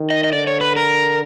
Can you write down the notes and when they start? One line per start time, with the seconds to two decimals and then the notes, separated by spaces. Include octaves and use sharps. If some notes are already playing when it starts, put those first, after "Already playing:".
Already playing: D#3
0.10 D#5
0.24 D#5
0.32 D3 D5
0.47 C#5
0.61 B4
0.76 A#4